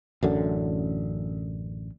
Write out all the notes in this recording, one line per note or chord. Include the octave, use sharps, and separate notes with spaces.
A1 F#2 D3